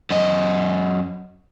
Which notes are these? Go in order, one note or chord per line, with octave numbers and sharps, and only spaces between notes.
F#2 D#5